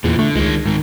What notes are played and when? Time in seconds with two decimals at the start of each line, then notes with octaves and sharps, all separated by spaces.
0.04 E2 A#2 E3
0.19 D3 A3
0.36 C#2 D#3 G#3
0.66 G#2 D#3